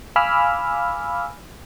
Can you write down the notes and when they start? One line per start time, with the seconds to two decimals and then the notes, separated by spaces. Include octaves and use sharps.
0.16 F5 G#5 B5 D6 E6 F6